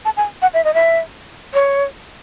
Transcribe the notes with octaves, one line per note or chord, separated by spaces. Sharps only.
A5
G#5
F#5
E5
D#5
E5
C#5